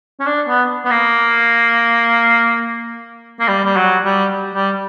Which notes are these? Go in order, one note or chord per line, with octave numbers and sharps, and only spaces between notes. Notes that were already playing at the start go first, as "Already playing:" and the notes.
C#4
D4
B3
B3
A#3
A#3
G3
G3
F#3
G3
G3